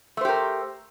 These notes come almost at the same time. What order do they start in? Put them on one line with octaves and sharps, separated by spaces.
A3 C5 G4 A#4